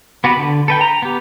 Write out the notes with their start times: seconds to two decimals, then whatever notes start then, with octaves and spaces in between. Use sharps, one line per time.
0.24 B3 F#4 G4 B4
0.37 D3
0.68 A4 B4 G5
0.81 A#5
1.02 B3 G4